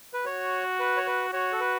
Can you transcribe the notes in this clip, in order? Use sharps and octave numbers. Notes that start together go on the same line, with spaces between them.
B4
F#4 C#5
B4
C#5
B4
F#4 C#5
A4
B4